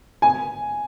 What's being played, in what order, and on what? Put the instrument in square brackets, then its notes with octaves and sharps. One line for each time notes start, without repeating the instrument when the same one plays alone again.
[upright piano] G#5